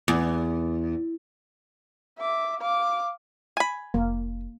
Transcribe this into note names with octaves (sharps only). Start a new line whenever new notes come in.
E2
E5 D6
F5 D6
G#5 B5
F1 A#3